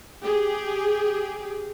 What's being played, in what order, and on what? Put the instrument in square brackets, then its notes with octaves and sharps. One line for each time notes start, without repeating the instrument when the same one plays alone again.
[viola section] G4 G#4